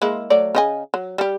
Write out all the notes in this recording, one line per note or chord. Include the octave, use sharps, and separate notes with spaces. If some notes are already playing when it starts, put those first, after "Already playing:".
G#3 A#3 E4
F#3 A3 D5
C#3 D#5 G#5
F#3
G3 G4